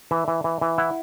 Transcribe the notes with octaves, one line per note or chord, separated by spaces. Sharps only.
E3 E5
E3
E3
E3
E4 F#5